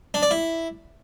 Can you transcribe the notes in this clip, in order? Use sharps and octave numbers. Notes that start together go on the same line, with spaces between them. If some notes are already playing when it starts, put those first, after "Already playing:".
D4
D5
E4